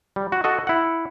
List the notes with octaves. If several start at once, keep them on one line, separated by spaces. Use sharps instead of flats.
G3
F#4
F#4 A4 D#5
E4 F#5